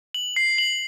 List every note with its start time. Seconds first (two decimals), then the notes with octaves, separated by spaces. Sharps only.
0.14 F#7
0.36 C7
0.58 F#7